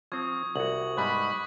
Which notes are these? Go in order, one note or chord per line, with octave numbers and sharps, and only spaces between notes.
F3 C4 C#6 D#6 G#6
C2 F#4 F#7
G#2 G3 B3 B5 C#6 F#6